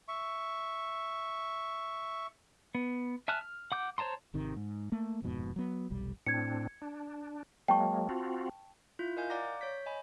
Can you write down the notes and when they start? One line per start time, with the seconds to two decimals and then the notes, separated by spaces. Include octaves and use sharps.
0.08 E5 C#6
2.75 B3
3.28 E5 G#5 A5 F6 F#6
3.41 F6
3.72 F#5 D6 G6
3.98 C5 C#5 A5 A#5 C6
4.34 G#1 C3 D#3
4.56 G#2
4.92 A3 A#3
5.22 D#1 F2 G#2 B2
5.56 F#3 B3
5.90 F1 B1 G3
6.26 A2 C4 D4 G#6 C#7
6.82 D4
7.68 F#3 G#3 A#3 G5 A5 C#6
8.09 C4 F4 F#4
8.99 E4 F4 G6
9.16 A#4 D#5 F5 G#5 G6
9.30 D5 F5 F#5 A#5 D6 A#6
9.61 C#5 G6 B6
9.86 D#5 G#5 B5